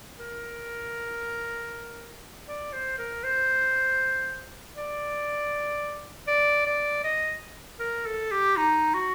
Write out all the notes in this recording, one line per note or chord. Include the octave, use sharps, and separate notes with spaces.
A#4
D5
C5
A#4
C5
D5
D5
D5
D#5
A#4
A4
G4
D#4
F#4